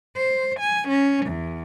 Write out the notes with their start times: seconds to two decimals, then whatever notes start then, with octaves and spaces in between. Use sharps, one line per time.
0.17 C5
0.59 G#5
0.89 C#4
1.27 E2